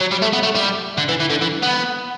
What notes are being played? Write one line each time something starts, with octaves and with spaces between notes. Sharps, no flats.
F#3
G3
A3
B3
A3
G3
D3
E3
E3
D3
E3
B3